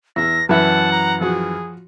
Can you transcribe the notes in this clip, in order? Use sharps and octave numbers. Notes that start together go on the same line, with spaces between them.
E2 E5 A#6
F#2 E3 B4 E5 F#5 A5
A#5
F3 F#4 G#4